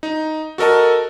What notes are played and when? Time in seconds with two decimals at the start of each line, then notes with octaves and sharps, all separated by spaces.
0.03 D#4
0.58 F#4 A4 A#4 D#5 A5